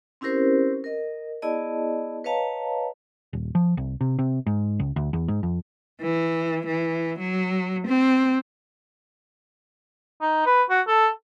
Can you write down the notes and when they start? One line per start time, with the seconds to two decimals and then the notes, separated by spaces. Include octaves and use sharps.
0.21 C4 C#4 E4 G4 A#4 C5
0.84 A#4 D#5
1.42 B3 E4 G#4 D5 D#5 A5
2.24 B4 C#5 D#5 F5 A5 A#5
3.33 D#1
3.55 F3
3.77 C2
4.01 C3
4.19 C3
4.47 G#2
4.80 C#2
4.96 D2
5.13 E2
5.28 G#2
5.43 F2
6.01 E3
6.66 E3
7.19 F#3
7.87 C4
10.21 D#4
10.46 B4
10.70 F#4
10.87 A4